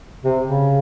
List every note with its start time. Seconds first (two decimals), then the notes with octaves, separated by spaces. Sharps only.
0.24 C3
0.43 C#3